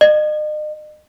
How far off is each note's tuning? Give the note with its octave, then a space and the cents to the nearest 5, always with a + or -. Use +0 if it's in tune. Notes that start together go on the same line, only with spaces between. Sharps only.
D#5 -40